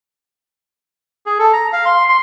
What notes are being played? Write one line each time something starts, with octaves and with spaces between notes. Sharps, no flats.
G#4
A4
A#5
F5
C6
C6